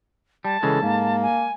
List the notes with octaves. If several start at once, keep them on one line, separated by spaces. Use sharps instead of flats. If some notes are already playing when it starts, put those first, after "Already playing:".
G3 A5
C#3 E3 G#3 A4
G#2 A#3
G#5